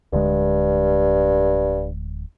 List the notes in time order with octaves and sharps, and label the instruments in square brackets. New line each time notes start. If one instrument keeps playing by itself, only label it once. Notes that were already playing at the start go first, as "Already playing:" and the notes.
[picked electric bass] D1 D3 G#3 [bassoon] G2